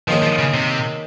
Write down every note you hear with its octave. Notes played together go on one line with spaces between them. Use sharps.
D#3 F3 A#3 C#4 G#4
F3
C#3
C3